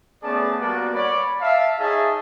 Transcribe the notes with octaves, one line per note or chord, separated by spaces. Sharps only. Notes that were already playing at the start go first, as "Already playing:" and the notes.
A3 B3 C#4 G#4 D5 A5
G3 A#3 B3 F#4 D5 F#5
C#5 D5 B5
E5 F5 A5
D#4 G#4 C#5 D#5 E5 A5